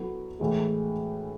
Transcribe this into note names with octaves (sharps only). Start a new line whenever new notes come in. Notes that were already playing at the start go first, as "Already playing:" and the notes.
Already playing: F#3 B3 E4 A4
A2 E3 G#3